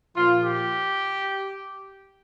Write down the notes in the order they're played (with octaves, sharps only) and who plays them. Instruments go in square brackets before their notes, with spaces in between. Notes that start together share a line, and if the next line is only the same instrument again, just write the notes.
[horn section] A#2 F3 F4
G4